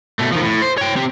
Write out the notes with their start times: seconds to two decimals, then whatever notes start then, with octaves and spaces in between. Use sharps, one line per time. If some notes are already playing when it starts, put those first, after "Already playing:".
0.19 B2 A3
0.32 D#3 F3
0.43 A2
0.62 C5
0.78 C#5 G5
0.96 C4 G4